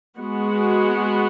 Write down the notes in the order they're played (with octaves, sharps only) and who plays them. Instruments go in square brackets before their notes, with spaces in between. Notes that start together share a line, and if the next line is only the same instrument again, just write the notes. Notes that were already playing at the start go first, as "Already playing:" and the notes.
[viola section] G#3 B3 F#4